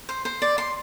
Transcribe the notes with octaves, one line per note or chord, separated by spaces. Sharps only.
C5
C5
D5
C6